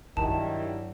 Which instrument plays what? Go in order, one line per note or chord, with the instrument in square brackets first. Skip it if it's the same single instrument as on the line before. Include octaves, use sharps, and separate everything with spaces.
[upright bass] G2 [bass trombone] D#3 [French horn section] F#3 G3 E4 [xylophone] A5